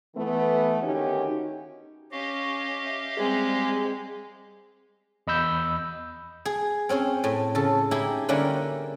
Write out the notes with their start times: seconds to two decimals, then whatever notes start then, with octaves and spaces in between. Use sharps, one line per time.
0.15 E3 A3 B3
0.82 D3 D#3 C#4 D#4 F#4 G4
2.12 C#4 G4 D#5 F5 C#6
2.85 E5
3.17 G3 G#3 C4 G#4
5.27 E2 D#5 B5 E6 G6
6.45 G#4
6.89 C4 C#4 G#4 C5
7.24 A2
7.55 C#3 A4
7.91 D#4 E4 G4 G#4
8.29 D3 G3 A#3 C#4 E4